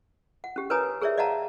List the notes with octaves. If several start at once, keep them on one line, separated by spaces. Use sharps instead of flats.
F#5
C#4 G4
A#4 B4 C#5 G#5 A#5 D#6
G#4 A#4 C#5 D5 E5
D5 D#5 F5 F#5 A5 A#5